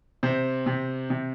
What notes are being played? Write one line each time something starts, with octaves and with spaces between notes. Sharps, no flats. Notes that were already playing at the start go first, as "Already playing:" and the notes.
C3 C5
C3
C3